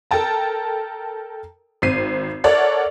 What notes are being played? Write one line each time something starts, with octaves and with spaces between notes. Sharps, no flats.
A4 A#4 G5 A5 A#5
G#1 C4 C7 D#7
A4 A#4 C#5 D5 E5 F#5